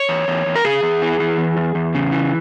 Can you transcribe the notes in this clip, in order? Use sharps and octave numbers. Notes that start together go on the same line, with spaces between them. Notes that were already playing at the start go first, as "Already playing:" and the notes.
Already playing: C#5
E2
E2
E2
A#4
C#3 G#4
E2
E3
E3
E2
E2
E2
C#3
E3